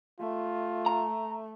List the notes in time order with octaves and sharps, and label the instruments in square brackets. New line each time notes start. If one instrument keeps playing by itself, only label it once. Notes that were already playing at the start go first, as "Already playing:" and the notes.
[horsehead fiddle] A3 [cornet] F4
[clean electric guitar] A#5